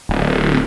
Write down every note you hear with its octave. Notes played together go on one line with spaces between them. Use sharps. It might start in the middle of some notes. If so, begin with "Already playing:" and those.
D1